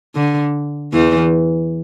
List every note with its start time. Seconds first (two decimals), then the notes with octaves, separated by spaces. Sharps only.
0.15 D3
0.93 E2 E3